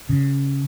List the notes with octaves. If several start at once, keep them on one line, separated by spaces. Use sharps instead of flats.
C#3